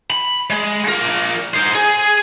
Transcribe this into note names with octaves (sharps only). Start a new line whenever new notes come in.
B5
G#3
F3 A#4
D#4 C5
G#4